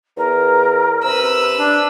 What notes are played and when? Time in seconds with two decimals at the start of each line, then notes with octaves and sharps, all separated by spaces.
0.17 E2 A#4
1.04 C3 B4 E6
1.59 D4